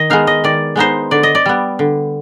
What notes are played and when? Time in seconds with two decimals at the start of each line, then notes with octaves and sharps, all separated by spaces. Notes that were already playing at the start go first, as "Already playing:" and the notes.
Already playing: D#3 D#5
0.10 G#3 B3 D#4 F5
0.27 D#5
0.44 D#3 D5
0.76 G#3 B3 D#4 C5
1.11 D3 D5
1.23 D#5
1.35 D5
1.46 G3 B3
1.79 D3